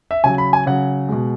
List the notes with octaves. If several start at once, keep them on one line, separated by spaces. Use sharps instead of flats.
E5
C#3 F#3 G#5
B5
G#5
C#3 F#3 F#5
B2 G#3